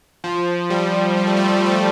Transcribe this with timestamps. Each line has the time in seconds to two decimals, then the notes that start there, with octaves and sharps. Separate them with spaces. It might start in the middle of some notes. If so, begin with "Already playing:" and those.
0.24 F3
0.70 G3
1.17 G3
1.27 A3
1.37 G3
1.46 A3
1.57 G3
1.66 A3
1.76 G3